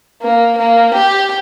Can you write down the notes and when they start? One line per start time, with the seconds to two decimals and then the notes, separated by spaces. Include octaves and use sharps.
0.22 A#3
0.58 A#3
0.94 G4